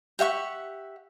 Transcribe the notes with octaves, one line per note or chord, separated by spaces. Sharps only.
G4 E5 F#5 C#6